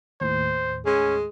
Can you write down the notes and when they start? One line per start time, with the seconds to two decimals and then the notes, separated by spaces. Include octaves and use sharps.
0.21 D#2 A2 C5
0.86 G#3 C#4